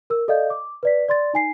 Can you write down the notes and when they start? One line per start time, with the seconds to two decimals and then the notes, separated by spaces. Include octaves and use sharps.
0.10 A#4 E6
0.28 A4 D5 D#5 F5 G6
0.50 D6
0.83 B4 D5 B6
1.08 D5 C6 A6
1.34 D#4 G#5 C7